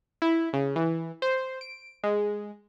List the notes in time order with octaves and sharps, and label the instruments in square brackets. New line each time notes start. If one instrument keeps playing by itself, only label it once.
[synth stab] E4
C#3
E3
C5
D7
G#3